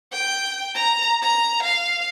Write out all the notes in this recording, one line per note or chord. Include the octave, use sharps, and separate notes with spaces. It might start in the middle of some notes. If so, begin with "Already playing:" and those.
G5
A#5
A#5
F5